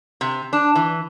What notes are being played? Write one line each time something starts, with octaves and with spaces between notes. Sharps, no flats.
C3
D4
E3